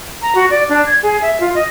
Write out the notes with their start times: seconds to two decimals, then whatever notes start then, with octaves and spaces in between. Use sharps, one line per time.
0.22 A#5
0.35 F#4
0.50 D5
0.69 D4
0.86 G#6
1.02 G#4
1.22 E5
1.40 F4
1.54 D#5